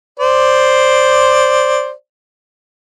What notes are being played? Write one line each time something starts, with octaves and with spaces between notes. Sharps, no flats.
C5 D5